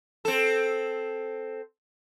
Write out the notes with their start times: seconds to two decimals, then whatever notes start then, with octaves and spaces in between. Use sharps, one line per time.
0.25 C4 A4